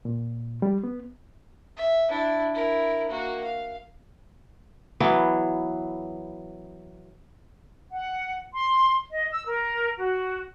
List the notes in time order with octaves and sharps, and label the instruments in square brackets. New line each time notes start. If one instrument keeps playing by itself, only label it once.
[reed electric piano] A#2
G3
B3
[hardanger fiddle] E5
D4 E4
E4 A#4
A#3 F#4
F5
[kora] E3 F#3 B3
[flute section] F#5
C6
D#5
E6
A#4
F#4